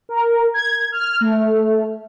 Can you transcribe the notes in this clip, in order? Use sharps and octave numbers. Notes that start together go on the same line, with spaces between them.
A#4
G#6
F6
A3